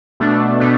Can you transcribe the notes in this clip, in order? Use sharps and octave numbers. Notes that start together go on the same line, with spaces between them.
B2 A3 D4
B2 A3 D4